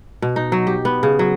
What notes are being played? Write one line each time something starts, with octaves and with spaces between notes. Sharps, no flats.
B2
D#4
F#3
G4
B3
C#3
F#3